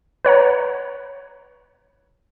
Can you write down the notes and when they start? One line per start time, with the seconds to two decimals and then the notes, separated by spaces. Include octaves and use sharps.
0.25 B4 C#5 F#5 A#5